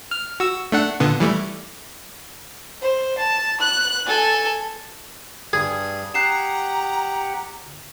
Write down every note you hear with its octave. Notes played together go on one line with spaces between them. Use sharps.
F6
F#4 E6
A3 D4 F#5
A#2 D3 B3
E3 G3 A3
C5
A5
F#6
A4 G#5
G2 G3 G#4
G4 F#5 A#5 F#6 C7 E7